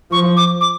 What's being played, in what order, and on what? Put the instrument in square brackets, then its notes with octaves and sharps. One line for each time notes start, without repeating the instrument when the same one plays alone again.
[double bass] F3 [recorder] C#6
[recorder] D6
D6